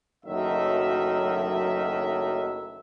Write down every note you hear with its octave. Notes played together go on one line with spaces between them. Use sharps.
F#1 D#3 F#3 A3 E5